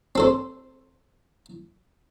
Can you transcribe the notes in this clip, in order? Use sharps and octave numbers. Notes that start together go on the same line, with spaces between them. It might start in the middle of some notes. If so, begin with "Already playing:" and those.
C4 A4 C5